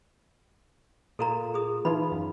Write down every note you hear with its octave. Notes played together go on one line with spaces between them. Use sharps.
A#2 F4 A4 A#4 A#5
G#4 D#6
E3 D#4 F4 B5
F#2